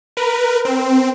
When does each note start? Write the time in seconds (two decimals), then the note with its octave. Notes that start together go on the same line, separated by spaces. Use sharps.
0.17 A#4 B4
0.65 C4